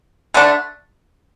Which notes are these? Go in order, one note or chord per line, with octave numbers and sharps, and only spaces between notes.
D3 A3 D4